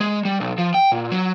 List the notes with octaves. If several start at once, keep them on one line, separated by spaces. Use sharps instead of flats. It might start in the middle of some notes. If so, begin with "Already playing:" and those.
G#3
G3
B1
F3
G5
A#2
F#3